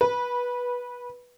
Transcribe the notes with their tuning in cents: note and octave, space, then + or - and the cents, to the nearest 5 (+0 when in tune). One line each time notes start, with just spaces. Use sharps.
B4 -15